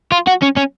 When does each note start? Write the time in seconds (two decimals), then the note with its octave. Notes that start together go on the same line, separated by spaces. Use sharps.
0.12 F4
0.27 F#4
0.42 C#4
0.56 C#4